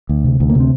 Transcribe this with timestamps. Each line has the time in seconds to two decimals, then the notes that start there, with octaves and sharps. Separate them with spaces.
0.09 D2
0.24 C3
0.40 D2
0.49 A#3
0.55 C3 C4